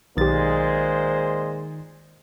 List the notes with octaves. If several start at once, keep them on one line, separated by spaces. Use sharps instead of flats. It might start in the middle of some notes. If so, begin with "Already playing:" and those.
B1 A#2 D#3 G#3 G4 C5 A6